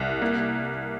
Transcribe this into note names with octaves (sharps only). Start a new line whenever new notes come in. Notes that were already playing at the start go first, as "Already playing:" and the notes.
Already playing: C2
A#3